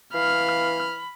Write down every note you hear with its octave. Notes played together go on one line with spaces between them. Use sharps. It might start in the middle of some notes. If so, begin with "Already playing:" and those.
E3 F5 B5 F6